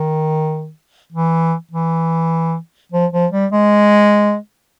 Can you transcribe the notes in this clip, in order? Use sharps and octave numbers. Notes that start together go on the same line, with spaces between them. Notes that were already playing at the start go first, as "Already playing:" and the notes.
Already playing: D#3
E3
E3
F3
F3
G3
G#3